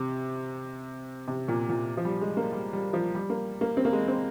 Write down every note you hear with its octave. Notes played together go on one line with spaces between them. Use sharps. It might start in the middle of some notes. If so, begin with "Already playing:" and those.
Already playing: C3
C3
A#2
A#2
F3
G3
G#3
A#3
G3
G3
F3
G3
A#3
A#3
C4
A#3
G#3
C4